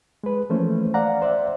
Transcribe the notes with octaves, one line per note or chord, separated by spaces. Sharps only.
G#3 B4
E3 F3 A3 A#3 C#4 C5
D5 F5 F#5 A#5
C5 D5 E5